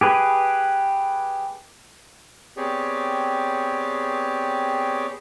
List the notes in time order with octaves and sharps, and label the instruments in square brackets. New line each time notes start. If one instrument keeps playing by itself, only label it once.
[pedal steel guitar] G4 G#4 B4
[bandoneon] B3 C4 G4 G#4 C#5 D5